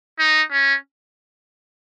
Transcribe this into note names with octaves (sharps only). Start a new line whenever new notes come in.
D#4
C#4